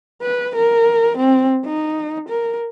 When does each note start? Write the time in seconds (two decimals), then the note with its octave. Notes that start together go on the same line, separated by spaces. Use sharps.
0.22 B4
0.56 A#4
1.17 C4
1.66 D#4
2.29 A#4